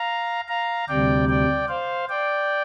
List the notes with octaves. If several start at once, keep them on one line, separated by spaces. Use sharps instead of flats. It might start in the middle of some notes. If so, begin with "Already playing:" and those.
Already playing: F5 A#5
F5 A#5
D2 C3 G3 D5 G5
D5 G5
C5 F5
D5 G5